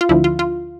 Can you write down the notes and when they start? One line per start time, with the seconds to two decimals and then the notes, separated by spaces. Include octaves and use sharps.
0.01 F4
0.09 D2 D3 F3 E4
0.24 F4
0.39 F4